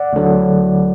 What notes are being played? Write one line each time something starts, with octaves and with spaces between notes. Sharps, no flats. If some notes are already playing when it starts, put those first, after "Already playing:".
Already playing: D5 F#5
D2 D3 F#3